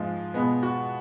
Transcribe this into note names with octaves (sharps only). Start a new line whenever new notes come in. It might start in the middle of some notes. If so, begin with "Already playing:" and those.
Already playing: G#2 F3 G#3 F4
B2 G#3 B3
F#4